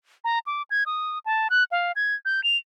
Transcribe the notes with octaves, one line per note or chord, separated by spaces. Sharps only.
A#5
D6
G#6
D#6
A5
F#6
F5
G#6
G6
F7